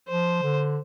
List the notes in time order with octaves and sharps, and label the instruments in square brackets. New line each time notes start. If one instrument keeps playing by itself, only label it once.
[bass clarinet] F3 [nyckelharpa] C5
[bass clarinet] D3